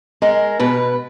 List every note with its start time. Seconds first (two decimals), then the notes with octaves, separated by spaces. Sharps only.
0.22 G#3 A#4
0.60 B2 B4